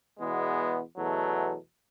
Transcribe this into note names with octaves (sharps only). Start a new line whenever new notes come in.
E2 B2 G#3 B3
E2 B2 F#3 A3